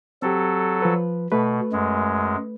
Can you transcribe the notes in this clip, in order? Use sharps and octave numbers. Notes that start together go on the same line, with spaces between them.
F#3 C4 G4 A4
F3 B4
B2 A3 B4
F#2 G#3